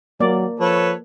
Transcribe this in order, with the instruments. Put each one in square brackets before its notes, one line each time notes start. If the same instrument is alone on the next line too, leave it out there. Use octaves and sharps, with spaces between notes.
[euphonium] F#3 [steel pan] A#3 D5
[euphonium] F3 [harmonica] A4 B4 C#5